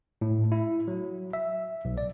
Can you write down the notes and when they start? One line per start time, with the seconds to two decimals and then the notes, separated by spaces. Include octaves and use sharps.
0.21 A2
0.52 E4
0.88 F#3
1.33 E5
1.85 B1
1.98 D5